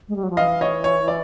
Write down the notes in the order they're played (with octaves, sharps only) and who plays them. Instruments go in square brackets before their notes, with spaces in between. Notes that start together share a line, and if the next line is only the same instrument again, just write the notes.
[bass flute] G#3
G3
F#3
F3
[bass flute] E3 [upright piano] D#5 F5
[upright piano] C#5 D#5
C#5
D5